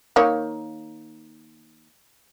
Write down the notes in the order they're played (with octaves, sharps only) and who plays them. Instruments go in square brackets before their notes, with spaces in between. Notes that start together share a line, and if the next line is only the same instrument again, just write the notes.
[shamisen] D#3 A#3 C#5